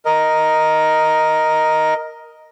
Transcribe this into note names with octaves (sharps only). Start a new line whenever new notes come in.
A#4 D#5